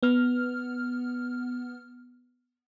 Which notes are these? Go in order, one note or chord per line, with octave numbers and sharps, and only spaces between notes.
B3 F6